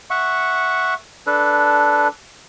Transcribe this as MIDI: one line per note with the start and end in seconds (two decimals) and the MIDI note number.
0.10 0.94 76
0.10 0.94 78
0.10 0.94 85
1.27 2.08 62
1.27 2.08 69
1.27 2.08 71